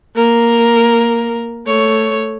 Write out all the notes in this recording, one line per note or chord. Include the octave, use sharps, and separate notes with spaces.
A#3 A#4
A3 C#5